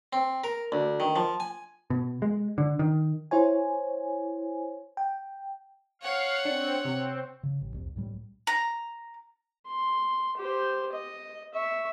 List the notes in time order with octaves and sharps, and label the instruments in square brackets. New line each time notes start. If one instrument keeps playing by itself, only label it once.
[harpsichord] C4
A#4
D2
D#3
F3
G#5
[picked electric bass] B2
G#3
D3
D#3
[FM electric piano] E4 C5 C#5 G#5
G5
[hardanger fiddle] C#5 F#5 [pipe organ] F5
[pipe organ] C4 [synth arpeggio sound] D4
[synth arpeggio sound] C3 [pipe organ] C4
[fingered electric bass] C#3
A1
C2 F2
C#2 A2 G3
[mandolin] A#5
[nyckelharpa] C6
G4 C5
D#5
E5 C#6